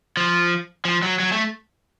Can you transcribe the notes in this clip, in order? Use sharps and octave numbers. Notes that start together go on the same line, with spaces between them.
F3
F3
F#3
F#3
A3